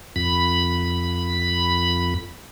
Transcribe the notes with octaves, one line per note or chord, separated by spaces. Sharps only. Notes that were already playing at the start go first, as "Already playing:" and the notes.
F2 B5